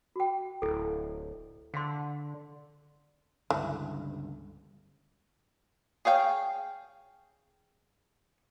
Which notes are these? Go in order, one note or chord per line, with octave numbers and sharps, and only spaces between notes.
F#4 G5
D1 E4 A4
D3 F5 C6
C#2 G2 D3 E3
G#4 C#5 F5 G5